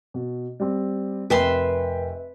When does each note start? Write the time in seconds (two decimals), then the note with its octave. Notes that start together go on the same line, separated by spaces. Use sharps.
0.14 B2
0.60 G3 C4
1.30 F1 A#4 B4 E5 G5 C6